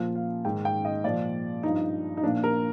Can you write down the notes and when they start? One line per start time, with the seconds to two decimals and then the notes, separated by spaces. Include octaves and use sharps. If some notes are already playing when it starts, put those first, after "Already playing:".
Already playing: A#2 F3
0.15 F5
0.45 G#2 D#3 G5
0.65 G5
0.85 D#5
1.04 A#2 F3 D5
1.63 G2 F3 D#4
2.17 D#4
2.23 F3 D4
2.26 A#2
2.44 A#4